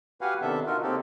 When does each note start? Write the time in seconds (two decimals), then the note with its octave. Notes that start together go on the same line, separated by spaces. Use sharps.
0.21 F#4 G4 B4 F5 F#5 G#5
0.41 C3 D#3 B3 D4 A4 E5
0.67 D#4 F4 F#4 A#4
0.83 C#3 A#3 C4 D#4 G4 A4